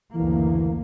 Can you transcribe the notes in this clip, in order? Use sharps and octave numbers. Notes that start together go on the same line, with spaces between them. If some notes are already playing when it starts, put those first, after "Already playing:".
F#1 D2 E3 A#3